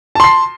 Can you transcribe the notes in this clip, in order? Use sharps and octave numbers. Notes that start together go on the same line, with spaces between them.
A5 C6 C7